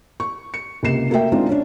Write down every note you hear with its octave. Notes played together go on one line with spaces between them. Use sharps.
C#6
C#7
C#2 C3 A#3 C7 E7
A3 A#3 F#4 A#4 E5 G5
G#3 C4 D4 D#4 F4
C#4 D4